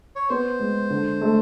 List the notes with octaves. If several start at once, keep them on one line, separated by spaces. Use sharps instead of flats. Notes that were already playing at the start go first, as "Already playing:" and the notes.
C#5
B3 C5
G#3
D3
A3